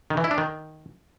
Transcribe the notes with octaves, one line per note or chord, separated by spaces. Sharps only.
D#3
E3
E4
D4
D#3